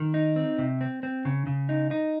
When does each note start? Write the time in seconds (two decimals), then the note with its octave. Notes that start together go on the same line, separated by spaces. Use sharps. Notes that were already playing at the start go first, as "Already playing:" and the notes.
Already playing: D#3
0.14 D#4
0.36 C4
0.58 C3
0.81 C4
1.03 C4
1.25 C#3
1.47 C#3
1.69 D#4
1.91 D#4